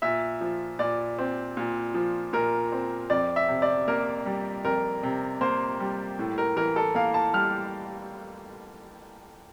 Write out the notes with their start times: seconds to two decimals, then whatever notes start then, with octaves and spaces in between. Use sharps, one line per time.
0.02 A#2 E5
0.41 F3
0.79 A#2 D5
1.19 C4
1.57 A#2
1.94 F3
2.33 A#2 A#4
2.72 C4
3.10 F2 D5
3.36 E5
3.48 C3
3.62 D5
3.88 A#3 A#4
4.26 G3
4.64 F2 A#4
5.03 C3
5.41 A#3 C5
5.80 G3
6.19 A2
6.38 A#4
6.56 E3 A#4
6.76 A4
6.95 A#3 F5
7.14 A5
7.33 G3 F6